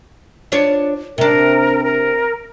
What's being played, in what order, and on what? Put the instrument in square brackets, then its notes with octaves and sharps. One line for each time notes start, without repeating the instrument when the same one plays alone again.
[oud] D4 F4 C#5
[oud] C3 D4 [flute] A#4
[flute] A#4